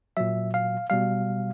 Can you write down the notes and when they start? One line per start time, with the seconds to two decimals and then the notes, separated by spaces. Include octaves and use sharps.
0.17 A#2 F#3 E5
0.54 F5
0.90 B2 G3 F5